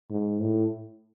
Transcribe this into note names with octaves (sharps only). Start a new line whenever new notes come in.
G#2
A2